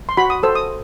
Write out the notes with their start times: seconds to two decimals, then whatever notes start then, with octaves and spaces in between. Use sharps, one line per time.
0.09 C6
0.17 F#4 B5
0.30 D#6
0.43 A4 C5 E6
0.55 D#6